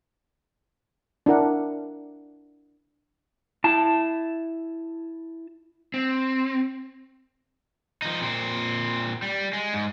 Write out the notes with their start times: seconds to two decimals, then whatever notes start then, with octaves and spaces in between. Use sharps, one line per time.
1.26 D4 E4 A#4 F#5
3.64 E4 A5
5.94 C4
8.02 F3 D#4
8.22 A#2 C4
9.22 G3
9.53 G#3
9.73 G#2